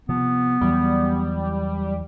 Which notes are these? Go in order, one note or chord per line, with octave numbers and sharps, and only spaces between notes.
C3 F3 B3
E2 E3 F#3 G3